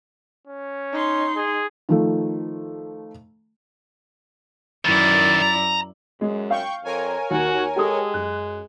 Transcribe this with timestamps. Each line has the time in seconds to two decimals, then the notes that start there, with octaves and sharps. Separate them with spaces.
0.47 C#4
0.93 D#4 C6
1.36 G#4
1.89 D#3 F3 A3
4.85 F#2 D#3 E3 E4 D5 A6
5.42 A#5
6.21 F#2 G#3
6.51 F5 G5 C#6 G6
6.84 F2 A#4 C#5 G#5
7.31 D#2 F#4
7.76 G#3 G4 A4 D#6
8.14 F#2 F#6